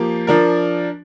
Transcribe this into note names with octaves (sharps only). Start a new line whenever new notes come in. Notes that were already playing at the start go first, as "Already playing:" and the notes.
Already playing: F3 A#3 G4
F3 D4 A#4